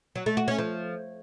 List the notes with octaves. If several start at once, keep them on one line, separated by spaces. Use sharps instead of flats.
F#3
A3
F#4
C#4
F3